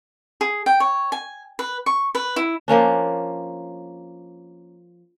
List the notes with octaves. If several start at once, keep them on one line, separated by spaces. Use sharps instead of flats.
G#4
G5
C#5
G#5
B4
C#6
B4
E4
F3 A#3 C#4 D4